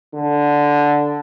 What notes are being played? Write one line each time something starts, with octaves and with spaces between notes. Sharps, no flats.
D3